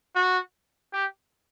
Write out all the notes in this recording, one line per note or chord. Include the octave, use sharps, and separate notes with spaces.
F#4
G4